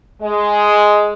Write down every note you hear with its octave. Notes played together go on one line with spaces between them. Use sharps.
G#3